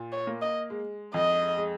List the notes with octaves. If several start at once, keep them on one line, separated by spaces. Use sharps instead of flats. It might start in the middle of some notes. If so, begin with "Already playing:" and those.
Already playing: A#2
C#5
A#3
D#5
G#3
F2 D#5
G#3